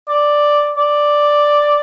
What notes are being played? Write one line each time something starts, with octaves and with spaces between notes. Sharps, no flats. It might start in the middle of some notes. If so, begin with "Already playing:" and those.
D5
D5